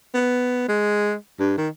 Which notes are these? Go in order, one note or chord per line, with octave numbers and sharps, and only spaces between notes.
B3
G#3
G2
D#3